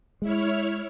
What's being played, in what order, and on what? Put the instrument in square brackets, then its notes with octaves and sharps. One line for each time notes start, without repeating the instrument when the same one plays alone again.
[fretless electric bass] G#3 [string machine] E4 C#5 F6